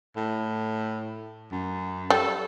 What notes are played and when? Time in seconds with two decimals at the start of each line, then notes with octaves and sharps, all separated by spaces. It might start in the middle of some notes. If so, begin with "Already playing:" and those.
0.16 A2
1.52 F#2
2.10 G3 A4